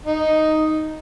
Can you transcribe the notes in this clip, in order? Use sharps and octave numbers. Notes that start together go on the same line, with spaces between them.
D#4